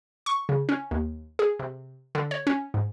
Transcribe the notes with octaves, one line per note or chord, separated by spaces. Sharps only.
C#6
C#3
C#4
D#2
G#4
C3
D3
C#5
C#4
G#2